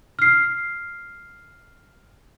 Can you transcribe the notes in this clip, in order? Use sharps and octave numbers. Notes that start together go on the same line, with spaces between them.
F6 C7